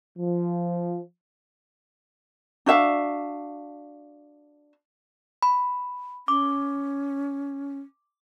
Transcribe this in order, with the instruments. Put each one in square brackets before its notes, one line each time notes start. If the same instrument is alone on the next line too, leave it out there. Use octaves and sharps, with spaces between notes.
[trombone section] F3
[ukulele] D4 F#4 E5 F5
[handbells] B5
[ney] C#4 [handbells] D6